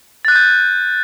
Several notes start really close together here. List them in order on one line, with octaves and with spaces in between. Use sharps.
A6 F#6 D#7 G6